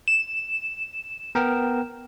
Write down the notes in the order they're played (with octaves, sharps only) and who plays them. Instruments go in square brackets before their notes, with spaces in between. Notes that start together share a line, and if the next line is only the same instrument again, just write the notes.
[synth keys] E7
[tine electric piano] B3 A#4 G5